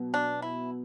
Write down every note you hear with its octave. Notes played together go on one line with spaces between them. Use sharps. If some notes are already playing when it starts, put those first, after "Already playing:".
Already playing: B2 F#3
D4
E4